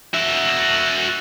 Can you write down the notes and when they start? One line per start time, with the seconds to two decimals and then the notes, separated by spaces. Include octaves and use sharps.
0.13 F#4 E5